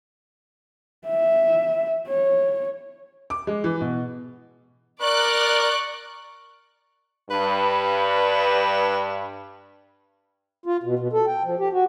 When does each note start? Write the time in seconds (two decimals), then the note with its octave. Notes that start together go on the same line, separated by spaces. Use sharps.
1.07 E5
2.07 C#5
3.30 D6
3.47 G#3
3.64 E3
3.81 B2
5.02 A#4 D5 C#6 F#6
7.30 G2 B4
10.66 F4
10.83 B2
10.99 B2
11.13 A4
11.27 G5
11.45 F3
11.59 G4
11.73 F#4